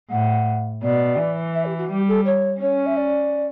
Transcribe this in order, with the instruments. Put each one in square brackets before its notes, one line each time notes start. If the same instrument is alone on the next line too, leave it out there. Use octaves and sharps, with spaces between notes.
[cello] A2 [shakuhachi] F#5
[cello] B2 [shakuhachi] D5
[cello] E3
[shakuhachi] E5
G4
F#4
[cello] G3 [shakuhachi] G4
[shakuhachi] A4
C#5
[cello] C#4 [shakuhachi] C#5
[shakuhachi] E5
D5